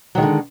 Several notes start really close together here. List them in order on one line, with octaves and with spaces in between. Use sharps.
F#3 D#3 G#3 D3